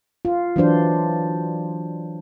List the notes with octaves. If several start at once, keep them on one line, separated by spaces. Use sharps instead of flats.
F4
E3 F#3 D4 C5